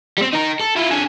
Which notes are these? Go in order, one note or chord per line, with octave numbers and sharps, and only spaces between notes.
G3 C4
D#4 A#4
A4
E4 F4
D3 G#4